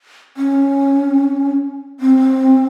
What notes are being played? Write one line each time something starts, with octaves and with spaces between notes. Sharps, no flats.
C#4
C4